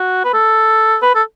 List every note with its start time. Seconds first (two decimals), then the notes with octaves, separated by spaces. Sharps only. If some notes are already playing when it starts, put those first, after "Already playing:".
Already playing: F#4
0.25 B4
0.34 A4
1.03 B4
1.15 A4